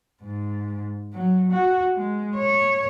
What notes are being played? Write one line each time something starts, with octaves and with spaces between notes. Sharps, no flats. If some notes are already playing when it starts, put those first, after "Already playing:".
G#2
F#3
F#4
G#3
C#5